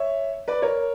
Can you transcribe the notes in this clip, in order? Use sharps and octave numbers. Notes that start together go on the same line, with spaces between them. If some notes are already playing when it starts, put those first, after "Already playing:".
Already playing: C#5 E5
B4 D5
A#4 C#5